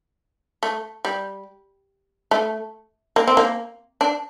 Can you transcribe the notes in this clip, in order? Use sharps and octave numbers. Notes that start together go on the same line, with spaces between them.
A3
G3
A3
A#3
C4
A#3
D4